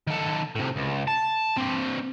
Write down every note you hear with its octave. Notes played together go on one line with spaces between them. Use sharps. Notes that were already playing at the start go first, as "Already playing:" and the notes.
D#3 A4
A2 C3
C#2
A5
C4 D4